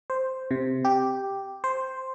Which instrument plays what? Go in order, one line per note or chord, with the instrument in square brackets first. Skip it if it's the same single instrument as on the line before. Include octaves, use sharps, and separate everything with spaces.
[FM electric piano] C5
C3
G4
C5